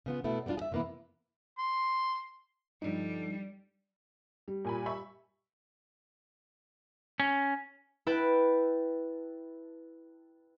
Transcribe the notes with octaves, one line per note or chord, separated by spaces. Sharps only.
C#3 B3 F4
B2 A3 B3 E4
G3 B3 C4 D4 F4
G#4 E5
C3 E3 A#3 B3 E4
C6
G2 D3 F3 G3 D4 D#4
G3
A#2 G#5 B5
E5 B5 C#6
C#4
E4 B4 G5 A5 F#6 D7